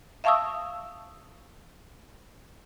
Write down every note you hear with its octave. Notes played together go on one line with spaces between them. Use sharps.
E5 F5 A5 C#6 D#6 E6